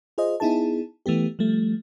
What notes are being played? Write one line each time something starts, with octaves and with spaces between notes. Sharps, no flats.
F4 G#4 C5 D#5
B3 D#4 E4 G#4 A5
E3 A3 B3 G4
F3 G3 A3